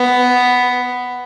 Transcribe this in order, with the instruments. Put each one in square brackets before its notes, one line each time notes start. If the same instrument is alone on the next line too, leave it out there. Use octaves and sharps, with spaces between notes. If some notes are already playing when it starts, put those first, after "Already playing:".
Already playing: [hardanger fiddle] B3